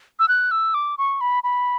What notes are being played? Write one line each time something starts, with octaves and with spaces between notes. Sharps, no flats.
E6
F#6
E6
D6
C#6
B5
B5